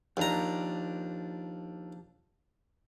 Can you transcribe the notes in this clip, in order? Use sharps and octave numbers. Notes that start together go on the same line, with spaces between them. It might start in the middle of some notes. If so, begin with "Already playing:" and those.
D#2 F3 D4 A#5